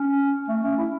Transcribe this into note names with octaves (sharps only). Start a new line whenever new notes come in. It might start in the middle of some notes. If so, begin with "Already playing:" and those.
Already playing: C#4
A3
C#4
E4